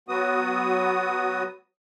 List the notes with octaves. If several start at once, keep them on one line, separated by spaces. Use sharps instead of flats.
F#3 B3 F#4 D#6